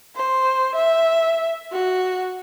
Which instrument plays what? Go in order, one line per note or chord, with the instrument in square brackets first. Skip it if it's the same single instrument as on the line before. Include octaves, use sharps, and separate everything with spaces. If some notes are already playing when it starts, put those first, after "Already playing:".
[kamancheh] C5
E5
F#4